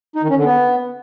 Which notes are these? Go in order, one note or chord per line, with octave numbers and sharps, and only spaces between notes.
D#4
D#3
C#4
D3
B3